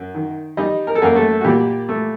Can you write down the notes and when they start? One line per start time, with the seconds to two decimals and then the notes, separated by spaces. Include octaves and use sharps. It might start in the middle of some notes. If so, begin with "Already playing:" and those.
Already playing: F#2
0.15 D#3
0.57 G3 D#4 D#5
0.87 A#4
0.95 A4
1.02 F#2 A#3 A#4
1.15 A3 A4
1.41 F#4
1.44 A#2 G3 G4
1.89 A3